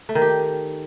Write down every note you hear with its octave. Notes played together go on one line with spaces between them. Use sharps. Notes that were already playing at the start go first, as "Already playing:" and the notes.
A3
D#3
G4